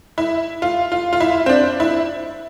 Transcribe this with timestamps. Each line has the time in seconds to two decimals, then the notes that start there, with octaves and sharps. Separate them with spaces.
0.18 E4
0.62 F4
0.92 F4
1.13 F4
1.20 E4
1.46 C4
1.49 D4
1.80 E4